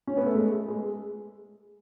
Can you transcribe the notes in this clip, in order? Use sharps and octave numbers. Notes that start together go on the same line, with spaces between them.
C#4
B3
A3
G#3
G#3